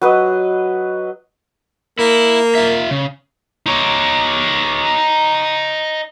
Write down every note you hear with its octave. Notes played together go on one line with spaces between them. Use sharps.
F#3 B4 D#5
A#3 E4
F4 E5
C#3
D#4 C#5